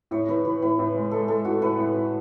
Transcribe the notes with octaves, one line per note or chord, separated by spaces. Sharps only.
A2 C#5
E3 B4
E3 B4
A2 B4
A2
G#3
G#3 A4
G#3 A4
A2 F#4
A2 B4
A2
A2